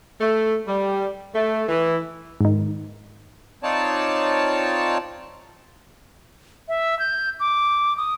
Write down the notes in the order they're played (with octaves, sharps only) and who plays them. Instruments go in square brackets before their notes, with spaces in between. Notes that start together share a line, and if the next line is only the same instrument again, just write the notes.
[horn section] A3
G3
A3
E3
[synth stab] G#2 D#3
[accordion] C4 D#4 F4 C#5 D5 A5
[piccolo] E5
G6
D6
D#6